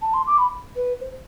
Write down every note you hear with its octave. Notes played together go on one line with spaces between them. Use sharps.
A5
C6
D6
B5
B4
C5